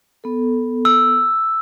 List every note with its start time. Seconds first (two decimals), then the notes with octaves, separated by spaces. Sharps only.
0.24 B3 A4
0.85 E6